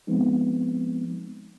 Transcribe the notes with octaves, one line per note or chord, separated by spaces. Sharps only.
F3 G#3 B3 C4 D#4